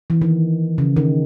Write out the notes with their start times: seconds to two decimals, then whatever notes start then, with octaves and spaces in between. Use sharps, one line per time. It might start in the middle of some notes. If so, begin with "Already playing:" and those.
0.10 E3
0.22 D#3
0.78 C#3
0.96 D#3